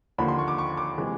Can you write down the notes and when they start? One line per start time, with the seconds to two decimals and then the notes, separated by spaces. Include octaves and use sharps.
0.18 D#2 D3 F3 A#3 B5
0.28 C6
0.39 C#6
0.48 D6
0.58 C#6
0.77 D6
0.97 C3 E3 G#3